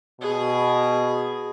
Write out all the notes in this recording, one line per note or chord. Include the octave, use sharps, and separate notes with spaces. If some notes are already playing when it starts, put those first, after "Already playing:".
B2 G#4